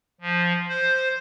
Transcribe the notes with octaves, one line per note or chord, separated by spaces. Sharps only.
F3
C5